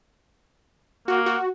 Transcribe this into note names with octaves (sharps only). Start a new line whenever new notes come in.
A#3 F#4
F#4